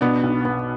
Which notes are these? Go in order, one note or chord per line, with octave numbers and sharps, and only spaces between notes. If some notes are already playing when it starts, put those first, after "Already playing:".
B2 B3 D4
B1
B3